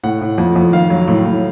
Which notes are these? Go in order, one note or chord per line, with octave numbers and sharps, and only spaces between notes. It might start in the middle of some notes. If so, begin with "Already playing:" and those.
A2 F#5
A2
F2
F2
D#3 F5
F#3
A2
A2